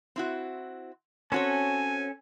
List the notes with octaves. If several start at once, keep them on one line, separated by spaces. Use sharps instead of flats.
C4 E4 F#4
C4 C#4 F#4 A4 C#5 G#5